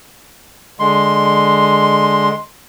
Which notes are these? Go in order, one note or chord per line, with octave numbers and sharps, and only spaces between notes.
D3 G#3 C6